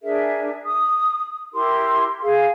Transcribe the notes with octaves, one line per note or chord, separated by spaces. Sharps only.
D4 G#4 A#4 E5
D#6
E4 G4 A#4 C6
G#4 F5